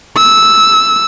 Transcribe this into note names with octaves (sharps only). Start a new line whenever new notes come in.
E6